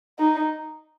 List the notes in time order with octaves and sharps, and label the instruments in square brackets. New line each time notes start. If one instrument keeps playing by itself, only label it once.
[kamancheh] D#4